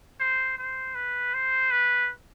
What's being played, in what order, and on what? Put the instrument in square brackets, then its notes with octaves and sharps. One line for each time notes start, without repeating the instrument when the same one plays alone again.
[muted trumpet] C5
C5
B4
C5
B4